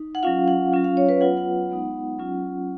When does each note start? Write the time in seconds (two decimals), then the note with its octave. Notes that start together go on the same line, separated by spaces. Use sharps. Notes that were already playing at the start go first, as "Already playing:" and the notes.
Already playing: D#4
0.15 F#5
0.23 F#3 C#4 F4 F5
0.48 F#5
0.73 F#3 C#4 F4
0.84 F5
0.97 C#5
1.09 B4
1.21 F#3 B3 F4 F#5
1.37 F#5
1.70 G#3 B3 D#4
2.19 F#3 C#4 F4